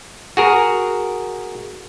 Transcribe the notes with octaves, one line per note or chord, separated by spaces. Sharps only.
F#4 G#4 A#4